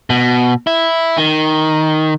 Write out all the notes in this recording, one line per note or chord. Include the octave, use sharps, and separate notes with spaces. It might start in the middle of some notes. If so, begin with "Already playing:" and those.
B2
E4
D#3